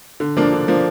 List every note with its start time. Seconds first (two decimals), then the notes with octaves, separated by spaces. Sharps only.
0.20 D3
0.37 F3 A#3 D4
0.53 D3
0.68 F3 A#3 D4